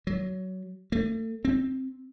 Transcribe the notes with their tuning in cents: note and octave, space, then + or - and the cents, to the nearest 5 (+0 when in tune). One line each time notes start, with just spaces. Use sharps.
F#3 +15
A3 +35
C4 +5